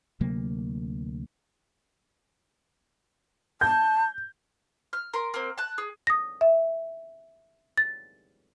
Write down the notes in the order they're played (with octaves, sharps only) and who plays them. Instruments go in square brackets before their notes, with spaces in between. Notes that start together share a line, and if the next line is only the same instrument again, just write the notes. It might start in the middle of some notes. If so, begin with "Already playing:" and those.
[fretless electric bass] D2 C3 F#3 A#3
[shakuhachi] A5 [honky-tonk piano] G6
[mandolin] F6
A#4 C6
A#3 C4
A5 F#6
G#4
[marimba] D#6 A#6
E5
A6